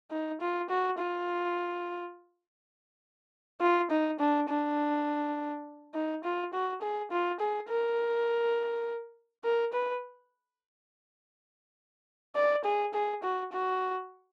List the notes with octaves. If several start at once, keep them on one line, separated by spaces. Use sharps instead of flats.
D#4
F4
F#4
F4
F4
D#4
D4
D4
D#4
F4
F#4
G#4
F4
G#4
A#4
A#4
B4
D5
G#4
G#4
F#4
F#4